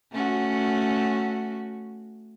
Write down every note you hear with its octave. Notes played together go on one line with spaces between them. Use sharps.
A3 C#4 F#4